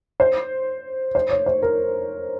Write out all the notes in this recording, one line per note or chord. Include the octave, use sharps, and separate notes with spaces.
C5
C5
C#5
C5
A#4